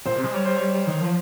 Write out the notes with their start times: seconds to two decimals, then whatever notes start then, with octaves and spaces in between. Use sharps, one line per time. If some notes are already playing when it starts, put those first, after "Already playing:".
0.06 A#2 C5
0.15 C3
0.24 G#3
0.33 G3 C#5
0.45 C5
0.56 C#5
0.87 D#3
1.01 F3